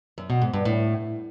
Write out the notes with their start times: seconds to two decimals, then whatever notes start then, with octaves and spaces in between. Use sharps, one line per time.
0.18 F#2
0.30 B2
0.42 G#2
0.53 G2
0.65 A2